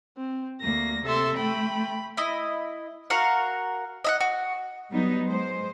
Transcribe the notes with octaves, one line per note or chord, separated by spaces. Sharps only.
C4
D2 A#3 A#6
C3 A4 E5 C6
A3 G5 B5
E4 D#5
F#4 A#4 F5 F#5
D#5 E5 F#5
F#4
F#3 G3 B3 D#4
G#3 C5